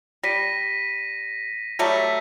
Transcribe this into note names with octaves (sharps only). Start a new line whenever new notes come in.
G3 A#6 B6 D#7
F#3 G3 A3